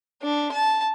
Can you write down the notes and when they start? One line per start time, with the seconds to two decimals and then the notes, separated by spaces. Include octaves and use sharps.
0.22 D4
0.52 A5